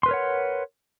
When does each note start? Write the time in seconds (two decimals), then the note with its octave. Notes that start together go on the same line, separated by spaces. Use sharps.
0.03 C6
0.06 B4
0.08 A#4
0.11 C#5
0.14 F#5